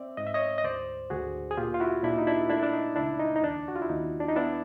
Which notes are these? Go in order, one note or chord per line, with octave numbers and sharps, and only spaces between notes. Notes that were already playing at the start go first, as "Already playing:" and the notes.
Already playing: C4 D5 E5
G#2 D#5
E5
C#5 D#5
D#5
D2 C5 D5
D2 F#4 G#4
G#4
A#2 F4 G4
F4
E4 F#4
A#2 D4 E4
D#4
D4 E4
A3 D4 E4
D4
D#4
C#2 D4 E4
D#4
D#4
D#2 D4
F#4
F4
E4
D#2 D#4
D4
D#4
B3 D4 E4